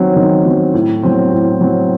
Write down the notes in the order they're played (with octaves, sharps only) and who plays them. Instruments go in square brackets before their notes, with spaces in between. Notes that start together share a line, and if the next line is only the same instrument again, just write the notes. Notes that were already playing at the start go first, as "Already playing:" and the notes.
Already playing: [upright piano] D#3 F#3 C4
D#3
F#3 C4
A2
F#3 C4
A2
F#3 C4